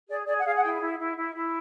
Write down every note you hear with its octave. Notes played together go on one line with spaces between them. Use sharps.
G#4 D5
G#4 D5
F#5
G#4 F5
F#5
E4 G5
E4
E4
E4
E4